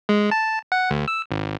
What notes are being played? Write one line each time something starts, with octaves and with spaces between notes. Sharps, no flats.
G#3
A5
F#5
D2
E6
G#1